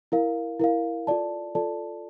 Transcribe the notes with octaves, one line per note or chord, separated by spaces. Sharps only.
E4 A#4 F5
E4 A#4 F5
F4 A4 D5 A5
F4 A4 D5 A5